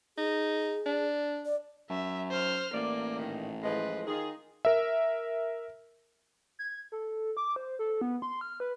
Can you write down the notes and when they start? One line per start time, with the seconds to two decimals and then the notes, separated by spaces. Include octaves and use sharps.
0.17 D#4 G#4
0.86 D4
1.46 D5
1.90 F#2 E5
2.31 C5 F6
2.74 A1 A#3 D5
3.19 A#2 D#3
3.63 A2 F3 G#3 B4
4.07 D#3 D#4 F4 G#4
4.65 A#4 E5
6.59 G#6
6.92 A4
7.37 D6
7.56 C5
7.79 A4
8.01 B3
8.22 C6
8.41 F6
8.60 B4